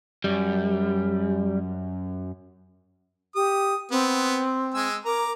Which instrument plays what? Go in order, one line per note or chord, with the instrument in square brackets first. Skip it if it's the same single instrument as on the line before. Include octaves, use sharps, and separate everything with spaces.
[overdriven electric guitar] F#2 [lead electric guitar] G3
[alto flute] G4 [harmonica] D#6
[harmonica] B3 [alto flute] C4
[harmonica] G#3 G#5 E6
[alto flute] A#4 [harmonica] A#5 D6